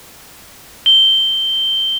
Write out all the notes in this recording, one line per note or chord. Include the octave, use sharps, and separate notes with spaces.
G7